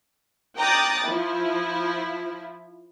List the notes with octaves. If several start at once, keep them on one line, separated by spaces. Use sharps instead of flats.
G5 A#5 D6 D#6 F#6 A6
F3 E4